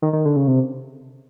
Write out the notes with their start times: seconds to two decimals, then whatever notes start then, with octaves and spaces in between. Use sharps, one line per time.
0.02 D#3
0.13 D#3
0.25 D3
0.36 C#3
0.47 C3